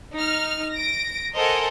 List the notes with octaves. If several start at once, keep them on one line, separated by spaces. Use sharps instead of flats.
D#4 F6
A#6 D7
A4 A#4 C5 D#5 F#5 G#5